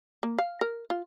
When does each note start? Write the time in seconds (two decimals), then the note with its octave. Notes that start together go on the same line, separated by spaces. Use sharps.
0.23 A#3
0.38 F5
0.61 A#4
0.90 F4